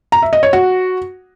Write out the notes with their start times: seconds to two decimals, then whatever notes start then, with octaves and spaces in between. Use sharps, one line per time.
0.12 A#5
0.22 E5
0.33 D#5
0.43 C#5
0.53 F#4